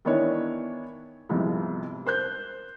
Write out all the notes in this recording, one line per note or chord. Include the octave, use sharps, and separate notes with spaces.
D#3 E3 B3 D4 E4 C#5
C2 F2 G#2 C3 F3 B3
A#4 C5 F#6 G6